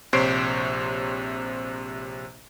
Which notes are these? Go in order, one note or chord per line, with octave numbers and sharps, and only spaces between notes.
A#1 C3 C5 C#5 C7 D7